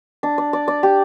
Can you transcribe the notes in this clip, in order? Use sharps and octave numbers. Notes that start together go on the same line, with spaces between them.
D4
D5
D5
D5
G4